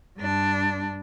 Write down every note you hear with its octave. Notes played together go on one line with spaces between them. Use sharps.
G2 D4